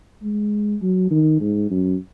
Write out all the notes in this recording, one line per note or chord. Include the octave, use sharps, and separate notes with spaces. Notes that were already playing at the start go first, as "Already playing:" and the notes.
G#3
F#3
D#3
G#2
F#2